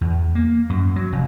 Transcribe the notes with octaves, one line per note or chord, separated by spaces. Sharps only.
E2
A#3
F#2
F#3
F1